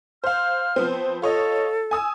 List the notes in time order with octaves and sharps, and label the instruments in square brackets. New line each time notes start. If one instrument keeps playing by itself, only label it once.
[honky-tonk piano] C5 F5 [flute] F6
[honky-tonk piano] F3 B3 C4
[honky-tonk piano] F4 C#5 D#5 [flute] A4
[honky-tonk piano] G#5 D#6 E6